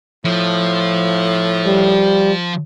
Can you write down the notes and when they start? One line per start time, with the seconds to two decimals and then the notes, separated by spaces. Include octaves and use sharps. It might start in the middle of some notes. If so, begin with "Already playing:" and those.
0.25 A2 F3
1.66 G3